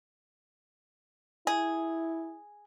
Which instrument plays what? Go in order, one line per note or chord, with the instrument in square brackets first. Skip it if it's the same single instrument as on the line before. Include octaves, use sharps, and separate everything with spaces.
[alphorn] E4 [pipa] G#4